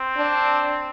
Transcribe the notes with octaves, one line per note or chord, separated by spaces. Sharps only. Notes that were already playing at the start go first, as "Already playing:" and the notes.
Already playing: C4
D4